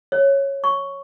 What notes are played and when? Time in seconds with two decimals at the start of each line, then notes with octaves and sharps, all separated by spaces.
0.12 C#5
0.64 C#6